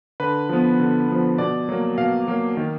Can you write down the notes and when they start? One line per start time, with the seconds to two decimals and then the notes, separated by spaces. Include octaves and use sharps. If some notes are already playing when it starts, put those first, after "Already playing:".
0.20 D3 B4
0.49 F3 B3
0.80 D3
1.09 F3 B3
1.38 B2 D5
1.69 F#3 A#3
1.98 B2 F5
2.28 F#3 A#3
2.57 D#3